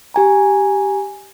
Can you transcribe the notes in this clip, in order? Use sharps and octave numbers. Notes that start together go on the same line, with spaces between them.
G4 G#5 A#5